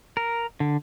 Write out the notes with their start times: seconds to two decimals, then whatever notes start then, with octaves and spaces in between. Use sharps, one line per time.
0.17 A#4
0.60 D3